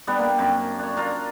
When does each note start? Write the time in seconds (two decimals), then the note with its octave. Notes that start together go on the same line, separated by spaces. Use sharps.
0.07 G3 B3 D4 G4
0.19 A#3
0.38 F#2 C4
0.79 D4 C#5
0.96 D4 F4 A#5